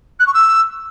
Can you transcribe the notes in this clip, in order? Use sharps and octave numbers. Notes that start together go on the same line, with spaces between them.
F#6
C#6
E6